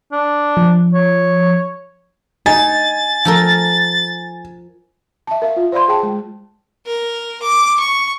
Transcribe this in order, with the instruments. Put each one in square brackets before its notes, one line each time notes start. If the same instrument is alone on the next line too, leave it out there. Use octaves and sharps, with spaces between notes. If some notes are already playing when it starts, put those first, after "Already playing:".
[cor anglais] D4
[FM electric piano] F3
[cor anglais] C#5
[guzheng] D#4 [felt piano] G#5 [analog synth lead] A6
[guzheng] F3 A4 A#4
[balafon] E5 A5
A#4 E5 F5
F4
C5 D5 F5 B5 C6
G#4 G5 A5
G#3
[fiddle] A#4
D6
C#6